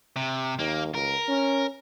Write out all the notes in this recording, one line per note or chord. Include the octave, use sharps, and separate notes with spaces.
C3
D#2 A#3
C#2 A#4
C#4